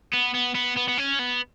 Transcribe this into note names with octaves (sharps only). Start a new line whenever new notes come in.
B3
B3
B3
B3
B3
C#4
B3